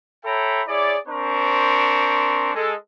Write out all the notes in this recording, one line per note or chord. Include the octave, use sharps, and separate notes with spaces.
A4 C#5 E5 G5 A#5 B5
E4 G#4 C#5 D5
C4 D4 A#4 C5 C#6
G#3 A4